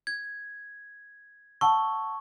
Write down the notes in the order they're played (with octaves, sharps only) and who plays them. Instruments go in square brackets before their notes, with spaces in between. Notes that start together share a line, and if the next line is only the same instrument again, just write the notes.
[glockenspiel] G#6
[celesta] F#5 A5 E6 [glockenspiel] C#6